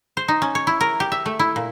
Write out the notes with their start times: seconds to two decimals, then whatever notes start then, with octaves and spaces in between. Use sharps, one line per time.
0.17 C5
0.28 D#4
0.42 C#4
0.55 C#5
0.67 E4
0.81 A#4
1.00 G4
1.12 E5
1.26 A3
1.39 E4
1.56 A#2